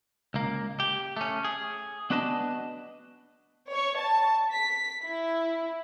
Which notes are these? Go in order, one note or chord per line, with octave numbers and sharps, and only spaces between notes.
C#2 A#3
G4
A3 C#4
G#4
B3 D4 F#4 B4 D#5 A5
C#5
A5
B6
E4